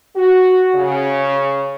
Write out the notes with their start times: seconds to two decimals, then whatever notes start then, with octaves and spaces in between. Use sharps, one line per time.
0.16 F#4
0.75 C#3